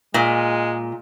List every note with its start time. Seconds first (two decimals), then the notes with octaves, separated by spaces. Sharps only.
0.14 A#2 G#3